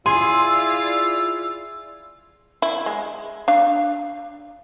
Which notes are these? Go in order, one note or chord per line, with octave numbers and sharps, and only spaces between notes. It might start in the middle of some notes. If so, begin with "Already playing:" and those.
E4 F4 G#4 D5 C6 E6
E4
G#3
D4 F5